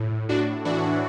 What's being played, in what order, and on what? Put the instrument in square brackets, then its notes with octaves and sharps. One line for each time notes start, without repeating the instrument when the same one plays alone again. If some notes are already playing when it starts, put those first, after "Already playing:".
Already playing: [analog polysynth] A2
A2 D4 F#4
E3 D4 F#4